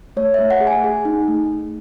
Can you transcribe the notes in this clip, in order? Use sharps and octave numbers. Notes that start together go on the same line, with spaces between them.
A3 C#5
E5
A3
F#5
G#4
G#5
G#4
D#4
A3